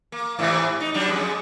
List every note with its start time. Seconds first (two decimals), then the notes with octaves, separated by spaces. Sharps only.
0.12 A#3
0.39 G#2 C3 E3
0.80 D#4
0.94 F#3 G3 D4
1.08 F2 G#3